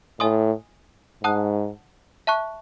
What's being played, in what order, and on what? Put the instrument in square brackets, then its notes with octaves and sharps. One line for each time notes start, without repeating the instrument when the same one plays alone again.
[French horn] A2 [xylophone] D#5 G#5 C6 D#6
[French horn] G#2 [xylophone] F#5 A5 D#6 F#6
[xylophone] E5 A5 C#6 F#6